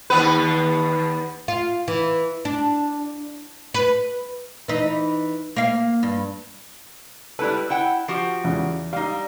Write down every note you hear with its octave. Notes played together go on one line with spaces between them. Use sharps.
D#2 B3 B4
F4
E3
D4
B4
E3 D#4
A#3 F5
G2
G3 E4 A4 B4
E4 F#5 G5
F3 F#4 G4
E2 C#3
G3 D#4 F5